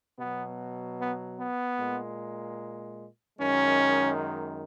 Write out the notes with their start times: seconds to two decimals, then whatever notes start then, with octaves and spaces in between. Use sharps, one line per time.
0.19 B2 F#3 B3
0.99 B3
1.38 B3
1.79 A#2 G#3
3.39 F#2 D#3 G#3 C#4